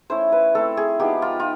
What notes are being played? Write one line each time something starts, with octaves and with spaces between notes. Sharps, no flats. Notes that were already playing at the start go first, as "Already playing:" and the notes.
A3 C#4 E4 C5
B4
A3 C4 E4 A4
G#4
F3 G#3 B3 D#4 G4
F4
F4